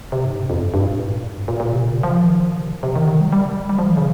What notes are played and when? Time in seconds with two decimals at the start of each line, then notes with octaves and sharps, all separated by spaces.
0.12 C3
0.24 G#2
0.37 G2
0.50 F2
0.62 G2
0.74 G2
0.86 A#2
0.98 G#2
1.11 G2
1.23 F2
1.35 G2
1.48 A#2
1.60 A#2
1.72 C3
1.85 C#3
2.03 F3
2.22 D#3
2.58 C3
2.71 A#2
2.83 C3
2.96 D#3
3.08 D#3
3.20 G3
3.33 G3
3.69 G3
3.79 F3
3.88 D#3
3.97 C#3